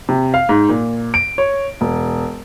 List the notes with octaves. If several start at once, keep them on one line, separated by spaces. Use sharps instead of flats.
C3
F5
G#2
A#2
D7
C#5
E1